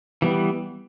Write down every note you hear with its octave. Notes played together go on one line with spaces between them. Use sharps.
E3 G3 B3